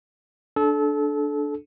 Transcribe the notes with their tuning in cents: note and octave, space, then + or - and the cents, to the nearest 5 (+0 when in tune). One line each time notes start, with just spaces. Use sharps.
D4 +0 A4 -25